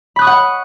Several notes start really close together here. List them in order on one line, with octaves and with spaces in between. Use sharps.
B5 F#6 D#6 C#6 F#5